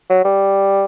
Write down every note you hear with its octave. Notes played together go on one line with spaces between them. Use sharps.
F#3
G3